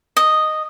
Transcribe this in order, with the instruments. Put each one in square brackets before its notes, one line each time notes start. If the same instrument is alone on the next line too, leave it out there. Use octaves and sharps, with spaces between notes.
[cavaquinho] D#5